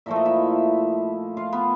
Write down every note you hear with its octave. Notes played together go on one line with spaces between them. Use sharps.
A#2 F3 A3 E5
D#5
E4 E5
F4 F5
B3 B4